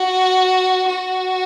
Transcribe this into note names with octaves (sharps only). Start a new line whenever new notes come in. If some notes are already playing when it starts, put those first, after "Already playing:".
Already playing: F#4
F#4